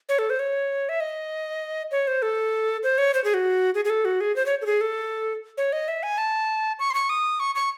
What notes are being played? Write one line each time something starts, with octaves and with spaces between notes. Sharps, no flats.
C#5
A4
C5
C#5
E5
D#5
C#5
C5
A4
C5
C#5
C5
G#4
F#4
G#4
G#4
A4
F#4
G#4
C5
C#5
A4
G#4
A4
C#5
D#5
E5
G#5
A5
C#6
C6
C#6
D#6
C#6
C#6